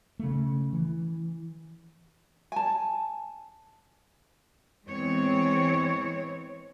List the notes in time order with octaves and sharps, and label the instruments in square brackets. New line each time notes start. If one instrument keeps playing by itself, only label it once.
[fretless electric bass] C#3 A3
E3
[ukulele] G#5 A5
[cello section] E3 G#3 B3 C4 C#5